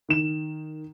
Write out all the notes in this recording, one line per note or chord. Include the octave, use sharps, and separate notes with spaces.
D#3 E7